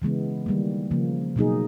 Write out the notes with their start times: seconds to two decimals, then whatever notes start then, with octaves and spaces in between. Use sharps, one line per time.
0.02 C#3 E3 G#3 B3
0.46 D#3 G3 A#3
0.91 C#3 F3 A#3
1.36 B2 F#3 A#3 D#4 G#4